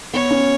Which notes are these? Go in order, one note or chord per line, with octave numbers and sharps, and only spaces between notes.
B3 C#5
C#4